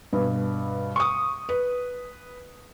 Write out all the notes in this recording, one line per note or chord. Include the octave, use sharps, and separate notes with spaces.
G2 B2
C#6 D#6
B4